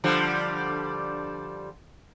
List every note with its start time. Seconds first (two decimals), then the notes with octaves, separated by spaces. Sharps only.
0.04 D3 F3 G3